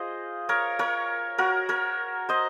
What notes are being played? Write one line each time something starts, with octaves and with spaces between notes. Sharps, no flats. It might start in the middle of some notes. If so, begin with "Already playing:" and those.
Already playing: F4 G#4 C5 D#5
A#4 C#5
A#4 C#5
F#4 A#4
A#4 C#5
C5 D#5